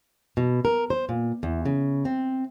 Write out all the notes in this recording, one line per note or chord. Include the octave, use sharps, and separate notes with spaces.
B2
A#4
C5
A#2
E2
C#3
C4